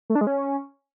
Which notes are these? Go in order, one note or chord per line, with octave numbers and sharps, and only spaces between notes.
A3
D4
G#3
C#4